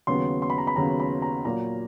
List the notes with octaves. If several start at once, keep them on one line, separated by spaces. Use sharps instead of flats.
D#2 C#3 F#3 B3 C6
C6
B5
A#5
B5
D#2 C#3 F#3 B3 A#5
B5
A#5
A#2 F#3 A#3 A#5